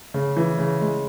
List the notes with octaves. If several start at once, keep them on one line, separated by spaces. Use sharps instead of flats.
C#3
E3
C#3
G#3